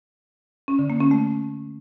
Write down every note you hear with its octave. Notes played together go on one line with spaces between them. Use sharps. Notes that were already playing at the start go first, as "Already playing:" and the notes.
C#4
D3
A#3
C#4
A3